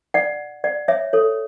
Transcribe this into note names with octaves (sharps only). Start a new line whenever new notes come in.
D5 F#5
D5 F#5
C#5 E5
A4 C#5